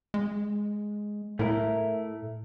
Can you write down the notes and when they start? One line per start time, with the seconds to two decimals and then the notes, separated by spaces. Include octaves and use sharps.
0.14 G#3
1.39 A2 A3 E4 A#4